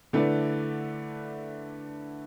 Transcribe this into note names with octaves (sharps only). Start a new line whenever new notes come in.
D3 A3 E4 B4 D5